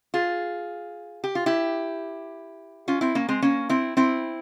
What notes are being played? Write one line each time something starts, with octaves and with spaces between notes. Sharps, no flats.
F4 G#4
G4
F4
E4 G4
C#4 F4
C4 E4
A#3 C#4
G#3 C4
A#3 C#4
C4 E4
C4 E4